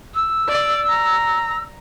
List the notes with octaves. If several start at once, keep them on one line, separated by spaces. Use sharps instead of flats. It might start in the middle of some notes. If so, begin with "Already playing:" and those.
E6
D5
A#5